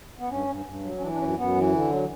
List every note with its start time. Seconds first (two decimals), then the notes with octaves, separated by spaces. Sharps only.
0.19 B3
0.29 G2 C#4
0.48 G2
0.66 G2
0.83 F#3
0.97 C#4
1.01 E3 D4
1.12 D4
1.19 F#2 C#4
1.37 F#2 B3
1.55 E3
1.73 D3
1.91 F#3